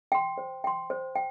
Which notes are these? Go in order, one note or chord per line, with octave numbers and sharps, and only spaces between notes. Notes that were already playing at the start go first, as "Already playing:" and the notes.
G5 C6
C5
G5 C6
C5
G5